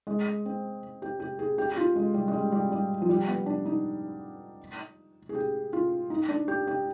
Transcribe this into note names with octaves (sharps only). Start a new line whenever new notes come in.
G#3
C4
G4
G4
G#4
G4
G4
F4
G#3
G3
G#3
G3
G3
G3
F3
G3
B3
D4
D#4
G#4
G4
F4
D#4
D4
G4
G4